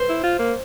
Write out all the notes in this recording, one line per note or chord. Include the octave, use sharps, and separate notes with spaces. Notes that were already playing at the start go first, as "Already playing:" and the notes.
Already playing: C5
E4
F4
A#3